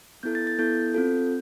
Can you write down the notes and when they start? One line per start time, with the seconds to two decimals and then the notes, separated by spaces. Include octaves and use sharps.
0.23 B3 E4 A4 G6
0.35 A6
0.47 A6
0.59 B3 E4 A4 G6
0.94 C4 F4 A4